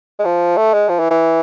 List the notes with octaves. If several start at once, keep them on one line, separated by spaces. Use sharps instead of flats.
G#3
F3
A3
G#3
F3
E3
E3